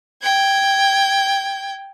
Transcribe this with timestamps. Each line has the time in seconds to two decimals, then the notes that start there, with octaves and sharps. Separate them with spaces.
0.22 G5 G#6